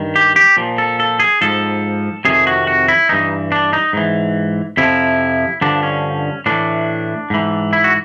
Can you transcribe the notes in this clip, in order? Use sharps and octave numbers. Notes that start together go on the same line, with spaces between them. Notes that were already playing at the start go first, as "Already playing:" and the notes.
Already playing: G2 D#3
G4
G4
A#2 F3
A4
A4
G#4
G#2 F3 A4
F2 C3 D#3 G#4
F#4
F#4
E4
G2 E3 D#4
D4
D#4
G#2 E3
F2 C3 F3 E4
G2 D3 F3 D4
C#4
A2 E3 D4
G#2 E3
E4
F#4